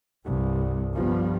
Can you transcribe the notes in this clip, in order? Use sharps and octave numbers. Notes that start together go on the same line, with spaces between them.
C2 G2
G1 G2 F3 B3